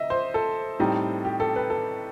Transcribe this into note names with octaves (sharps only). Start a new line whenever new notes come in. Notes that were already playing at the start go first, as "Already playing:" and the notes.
Already playing: D#5 E5
C5
A4
A2 G3 C4 D#4
G4
A4
B4
A4